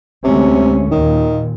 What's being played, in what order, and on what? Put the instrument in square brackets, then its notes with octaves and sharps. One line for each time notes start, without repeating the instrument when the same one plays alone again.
[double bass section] D2 G#3 C#4 [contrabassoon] C3
[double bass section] D#2 A#2 [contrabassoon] D#3